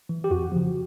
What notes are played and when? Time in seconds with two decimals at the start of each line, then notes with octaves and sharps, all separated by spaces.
0.09 E3
0.24 G4
0.31 F2 F#4
0.52 C#3 F3